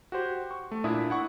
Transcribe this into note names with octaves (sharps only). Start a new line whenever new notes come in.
F#4 G4 C5
C#6
A3
A#2 D4 E4 E5 D#6
E4 F#5 C#6